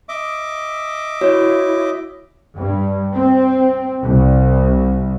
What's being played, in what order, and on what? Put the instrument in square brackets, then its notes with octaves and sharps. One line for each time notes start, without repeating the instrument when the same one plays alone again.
[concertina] D#5 E5 D6
[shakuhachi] E4 [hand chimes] F#4 C#5
[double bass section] G2
C4
C2